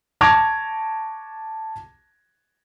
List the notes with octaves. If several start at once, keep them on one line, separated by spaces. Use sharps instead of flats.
A5 C#6 D6 G#6 A#6 F7